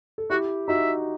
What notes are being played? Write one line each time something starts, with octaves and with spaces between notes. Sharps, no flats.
A4
E4 F#4 G4
D#4 F#4 E5